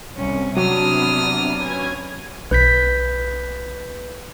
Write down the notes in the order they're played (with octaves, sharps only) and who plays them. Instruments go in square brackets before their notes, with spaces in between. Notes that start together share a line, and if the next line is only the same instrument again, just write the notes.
[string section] C2 [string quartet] C#4
[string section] C3 B3 D4 [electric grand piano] F#3 [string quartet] D#6 F6
[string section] C#4 B4 G#6
[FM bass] B1 [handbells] B4 G6 B6